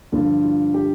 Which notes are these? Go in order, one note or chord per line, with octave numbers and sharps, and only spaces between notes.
G2 D3 F3 F4
F4
G4